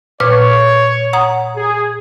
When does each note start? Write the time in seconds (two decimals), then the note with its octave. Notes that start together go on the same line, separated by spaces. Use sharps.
0.20 A#2 B4 C#5 F6
1.13 F#5 A#5 D#6
1.55 G#4